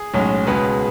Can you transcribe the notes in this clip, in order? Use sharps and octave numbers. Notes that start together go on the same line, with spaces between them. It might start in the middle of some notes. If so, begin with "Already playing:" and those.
Already playing: G#4
B1 A2 G#3 C#4
C#2 B2 G#3 B3 B4